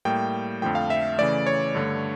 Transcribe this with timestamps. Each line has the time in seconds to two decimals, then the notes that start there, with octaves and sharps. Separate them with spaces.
0.05 A2 G3 A#3 G5
0.62 F2 D3 F3 A3 G5
0.75 F5
0.90 E5
1.18 C#3 E3 A3 D5
1.47 C#5
1.75 G2 D3 A3